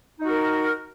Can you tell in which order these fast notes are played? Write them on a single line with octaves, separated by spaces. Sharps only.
D#4 F#4 A#4